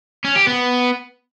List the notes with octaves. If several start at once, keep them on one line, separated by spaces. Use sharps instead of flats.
C#4
G4
B3